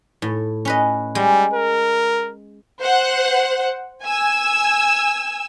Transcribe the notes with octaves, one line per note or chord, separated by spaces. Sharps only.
A2
C#4 B4 D#5
G3 G#3
A#4
C5 F#5
G#5 E6